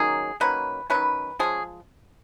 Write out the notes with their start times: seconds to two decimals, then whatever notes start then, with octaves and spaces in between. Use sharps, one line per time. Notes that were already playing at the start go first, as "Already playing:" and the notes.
Already playing: D#3 F#3 A#3 C#4 G#4
0.40 D#3 F#3 A#3 C#4 B4
0.90 D#3 F#3 A#3 C#4 B4
1.39 F3 G#3 C#4 G#4